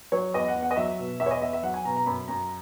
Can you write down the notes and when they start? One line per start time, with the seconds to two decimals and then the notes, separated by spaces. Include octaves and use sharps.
0.12 F#3 C#5
0.34 E2 D#5
0.48 F#5
0.56 E2
0.63 F#5
0.71 D#5
0.77 F#3 E5
0.99 B2
1.20 E2 E5
1.26 C#5
1.31 D#5
1.41 E2 E5
1.53 E5
1.63 F#3 F#5
1.74 G#5
1.85 B2 A#5
1.97 A#5
2.06 F#2 B5
2.28 F#2 A#5